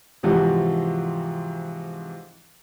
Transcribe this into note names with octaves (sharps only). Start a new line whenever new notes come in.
G#2 C3 E3 F3 F#4